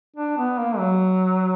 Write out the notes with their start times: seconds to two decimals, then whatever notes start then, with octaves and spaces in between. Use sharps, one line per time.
0.16 D4
0.38 B3
0.58 A#3
0.78 F#3